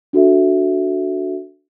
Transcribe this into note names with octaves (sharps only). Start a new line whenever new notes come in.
D4 F#4 A4 E5